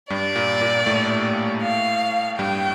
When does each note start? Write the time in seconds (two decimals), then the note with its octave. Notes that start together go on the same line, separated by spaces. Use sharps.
0.10 G2 G3 D5
0.36 A#2 A#3
0.61 A#2 A#3
0.86 A2 A3
1.62 F5
2.38 G2 G3 G5